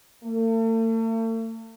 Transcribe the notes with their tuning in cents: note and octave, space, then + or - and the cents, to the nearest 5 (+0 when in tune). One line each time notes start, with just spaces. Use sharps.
A3 +45